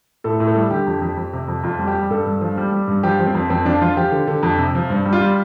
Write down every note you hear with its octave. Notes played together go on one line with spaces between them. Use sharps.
A2 A4
A2
A4
G3
D3 G4
F2
F2
F2
C3
F2
F2 F4
G3
G4
G3
G2 A4
G2
F3
G3
G3
G2
F3 G4
F3
C4
F2
F2 C4
F3 D4
F3 F4
F3 G4
D3
D3
F2
C3
F3
G2
G3
F4
G3